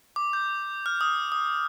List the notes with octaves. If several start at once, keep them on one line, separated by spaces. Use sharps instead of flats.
D6
G6
F6
D#6
D#6